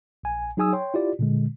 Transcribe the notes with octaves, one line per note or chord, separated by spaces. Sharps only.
A#1 G#5
F#3 D#4 G#4 G#5 D#6 E6
C#5 G5 C6
E4 F4 G4 D5
A#2 D3 G#3